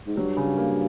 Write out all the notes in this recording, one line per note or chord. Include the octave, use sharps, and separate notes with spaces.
G#2
G2 F#3
C#3
A#3